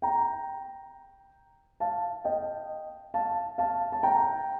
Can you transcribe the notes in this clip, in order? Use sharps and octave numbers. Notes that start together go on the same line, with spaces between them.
G5 A#5
F5 A5
D#5 G5
F5 A5
F5 A5
A5
G5 A#5